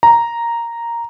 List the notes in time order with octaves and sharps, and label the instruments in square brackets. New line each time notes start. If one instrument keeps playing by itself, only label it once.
[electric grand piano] A#5